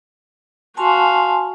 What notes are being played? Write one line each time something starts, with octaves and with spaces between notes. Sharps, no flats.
F#4 F5 G#5 A5 C6